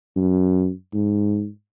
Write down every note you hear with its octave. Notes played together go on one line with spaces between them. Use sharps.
F#2
G#2